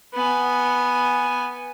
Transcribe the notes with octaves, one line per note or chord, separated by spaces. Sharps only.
B3 G#5